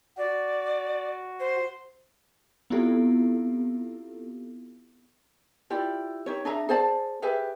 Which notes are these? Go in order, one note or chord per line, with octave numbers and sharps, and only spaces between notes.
F#4 D5
C5
B3 C4 E4 F4 G4 A4
E4 F4 G4 D5
D#4 G4 C#5
D4 G#4 E5 A#5
G#4 C5 D5 A5
G4 G#4 B4 E5